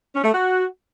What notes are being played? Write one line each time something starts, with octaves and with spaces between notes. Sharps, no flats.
C#4
A3
F#4